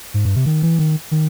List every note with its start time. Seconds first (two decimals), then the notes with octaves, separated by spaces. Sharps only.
0.14 G#2
0.25 G2
0.36 C3
0.46 D#3
0.62 E3
0.79 D#3
1.11 D#3